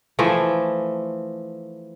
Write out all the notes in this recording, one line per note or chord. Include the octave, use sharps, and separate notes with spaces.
E3 F3 A3